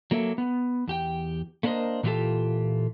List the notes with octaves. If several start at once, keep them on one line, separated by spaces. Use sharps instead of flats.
F#3 A#3 A4 E5
B3
E2 G4 G5
A3 A#3 D4 A#4 C5 D#5
A#2 E3 F#3 F4 G4 A4